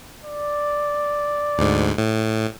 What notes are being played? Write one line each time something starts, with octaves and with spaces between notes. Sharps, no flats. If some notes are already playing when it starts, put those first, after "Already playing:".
D5
D2 G#2
A2